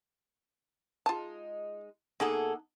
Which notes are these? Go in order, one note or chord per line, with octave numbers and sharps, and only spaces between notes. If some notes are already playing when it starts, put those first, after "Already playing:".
G#3 D#4 F4 A5
B2 A#3 D#4 G#4 A4 E5 F#5